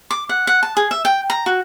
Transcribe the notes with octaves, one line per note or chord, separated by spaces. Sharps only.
D6
F#5
F#5
A5
G#4
E5
G5
A#5
F#4